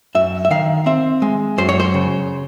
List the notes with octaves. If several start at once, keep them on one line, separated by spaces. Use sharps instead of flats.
F#2 E5
E5
D#3 F5
C4 E5
G#3
F#2 C5
C#5
C5
C#3